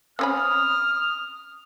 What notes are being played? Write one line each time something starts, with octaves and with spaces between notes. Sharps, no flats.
C4 C#4 B5 D#6 F6